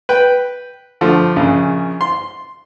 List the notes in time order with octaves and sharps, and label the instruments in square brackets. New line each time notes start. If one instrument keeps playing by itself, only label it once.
[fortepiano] B4 G5
D3 F3 A3
A#1 C#3
C6